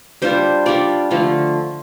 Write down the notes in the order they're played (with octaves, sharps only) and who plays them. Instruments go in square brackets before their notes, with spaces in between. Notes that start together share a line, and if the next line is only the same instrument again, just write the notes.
[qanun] G3 D4 F4 C5
G3 D4 F4 D5
D3 F3 A3 F4